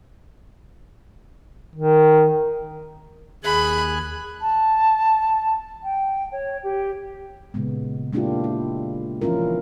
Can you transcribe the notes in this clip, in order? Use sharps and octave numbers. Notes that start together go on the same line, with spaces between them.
D#3
D#2 G#4 G#5 B5 F#6
A5
G5
C#5
G4
A#2 C#3 G#3 B3
G#3 A#3 D4 E4 F4 G4
E4
E3 F3 C#4 E4 F4 A#4